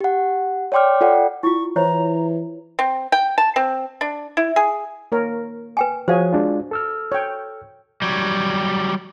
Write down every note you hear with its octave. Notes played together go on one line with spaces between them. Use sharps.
G4 F#5
C#5 D5 G5 C6 D6 F6
F4 A4 D5 F#5 G5
E4 F4 C#6
E3 E4 C5 C#5 A#5
C4
G5
A5
C4
D4
E4
G#4
A#3 A#4 C#5
B4 G5 G#5
F3 F#4 G#4 C5 C#5 F5 G#5
G#3 D4 F4
A4 E6 F6
C#5 G5
F#3 G3